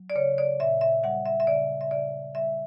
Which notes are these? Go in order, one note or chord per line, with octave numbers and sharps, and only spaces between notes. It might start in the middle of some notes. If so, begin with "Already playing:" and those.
Already playing: F#3
D5
C#3 C#5
D5
A#2 E5
E5
G3 F#5
E5
E5
C#3 D5
E5
C#3 D5
G3 E5